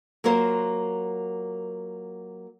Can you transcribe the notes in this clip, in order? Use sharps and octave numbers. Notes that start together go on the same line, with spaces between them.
F#3 A#3 F4 A#4 C5